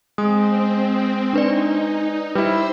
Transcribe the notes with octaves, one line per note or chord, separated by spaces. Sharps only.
G#3 C4 D#6
D4 D#4 B4 D5
G3 E4 B4 C5 E6